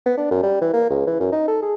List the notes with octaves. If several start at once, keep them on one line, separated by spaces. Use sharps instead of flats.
B3
D4
F#2
G3
E3
A#3
C#2
E3
F#2
D#4
A4
G#4